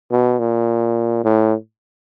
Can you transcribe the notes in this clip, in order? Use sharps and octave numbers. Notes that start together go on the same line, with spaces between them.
B2
A#2
A2